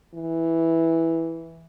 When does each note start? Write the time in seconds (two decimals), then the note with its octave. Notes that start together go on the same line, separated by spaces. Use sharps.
0.14 E3